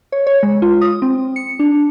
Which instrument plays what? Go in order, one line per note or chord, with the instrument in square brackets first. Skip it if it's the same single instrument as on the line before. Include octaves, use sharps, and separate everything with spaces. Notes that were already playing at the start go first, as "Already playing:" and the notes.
[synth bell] C#5
C#5
G#3
F4
D#6
C4
C#7
D4